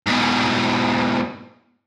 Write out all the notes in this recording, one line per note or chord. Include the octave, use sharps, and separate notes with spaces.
G#2 B2